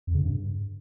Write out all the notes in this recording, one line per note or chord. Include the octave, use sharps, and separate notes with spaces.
F2
C#3
G2